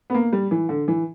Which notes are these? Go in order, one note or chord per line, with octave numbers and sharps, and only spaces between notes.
B3
A#3
G3
E3
D3
E3